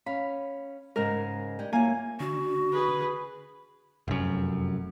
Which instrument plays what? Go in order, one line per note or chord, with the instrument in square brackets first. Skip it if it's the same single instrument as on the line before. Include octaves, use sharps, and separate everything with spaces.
[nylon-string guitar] C#4 F5 [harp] B5
[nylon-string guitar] G#2 C#3 G#3 [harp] A#4
[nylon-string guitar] G#3 D4 G4
[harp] A#3 G#5 [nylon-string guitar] E4 F4 C#5
[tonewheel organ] D3 [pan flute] F#4
[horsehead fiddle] G#4 B4
[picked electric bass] F1 F#2